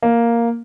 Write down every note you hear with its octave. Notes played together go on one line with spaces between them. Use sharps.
A#3